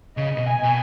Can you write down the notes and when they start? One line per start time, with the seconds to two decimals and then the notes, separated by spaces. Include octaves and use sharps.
0.17 C#3 D#5
0.37 B2
0.47 G#5
0.63 B2